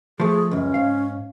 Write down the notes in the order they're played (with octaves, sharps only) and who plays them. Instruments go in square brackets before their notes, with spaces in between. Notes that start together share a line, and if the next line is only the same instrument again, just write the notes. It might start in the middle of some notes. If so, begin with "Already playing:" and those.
[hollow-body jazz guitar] F3 A3 [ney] G#4
[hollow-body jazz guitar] C#2 F#2 [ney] C#4
[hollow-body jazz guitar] G#2 F5